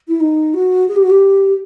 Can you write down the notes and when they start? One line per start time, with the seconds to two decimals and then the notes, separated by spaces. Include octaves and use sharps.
0.08 E4
0.20 D#4
0.54 F#4
0.89 G#4
0.96 G4
1.03 F#4
1.10 G4